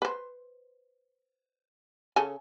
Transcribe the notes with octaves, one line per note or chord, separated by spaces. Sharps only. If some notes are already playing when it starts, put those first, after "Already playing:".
B4 C5
C#3 A4 G#5